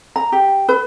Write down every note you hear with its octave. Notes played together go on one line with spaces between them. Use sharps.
A#5
G4
B4